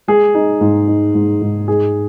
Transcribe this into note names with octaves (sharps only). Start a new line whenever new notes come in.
G#3 G#4
D#4
G#2
D#4
G#2
G#2
D#4 G#4